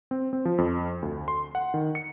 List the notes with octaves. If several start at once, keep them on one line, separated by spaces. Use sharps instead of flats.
C4
C4
F3
F2
D2
C6
F#5
D#3
C#7